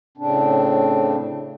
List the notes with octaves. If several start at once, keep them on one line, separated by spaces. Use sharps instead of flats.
A2 C#3 C4 D4